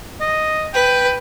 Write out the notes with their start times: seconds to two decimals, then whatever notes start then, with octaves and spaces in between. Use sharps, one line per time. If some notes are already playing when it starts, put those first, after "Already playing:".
0.21 D#5
0.74 B4 G5